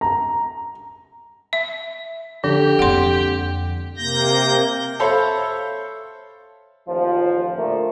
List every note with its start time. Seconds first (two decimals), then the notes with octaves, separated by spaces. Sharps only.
0.01 A#5
1.53 E5
2.44 D3 F3 G4
2.79 F2 A#3 F#5 C6
3.97 C3 A#3 G6 A#6
5.00 A4 C5 C#5 E5 F5 B5
6.89 A1 D#2 F3
7.57 A#2 D3 F3 A3 A#3